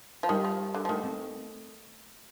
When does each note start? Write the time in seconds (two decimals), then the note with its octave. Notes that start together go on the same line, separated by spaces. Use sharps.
0.23 F3
0.29 D#3 G3
0.45 F3
0.74 D3
0.85 F3
0.89 D#3 A3
1.03 C4